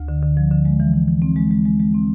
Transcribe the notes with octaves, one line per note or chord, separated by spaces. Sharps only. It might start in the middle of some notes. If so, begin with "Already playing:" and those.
Already playing: D2
D3
D3
F3
D3
G#3
E3
E3
E3
C4
G#3
G#3
G#3
G#3
C4